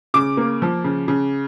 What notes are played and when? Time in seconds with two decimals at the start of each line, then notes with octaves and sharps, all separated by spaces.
0.14 C#3 D6
0.37 A#3
0.62 F3
0.84 C#3
1.08 C#3